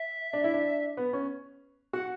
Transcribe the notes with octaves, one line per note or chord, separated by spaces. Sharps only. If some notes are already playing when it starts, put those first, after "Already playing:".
Already playing: E5
D4
E4
D4
B3
C#4
F#4 F#5